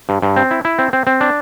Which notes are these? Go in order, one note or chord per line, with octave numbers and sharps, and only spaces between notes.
G2
G2
C4
E4
E4
C4
C4
C4
D4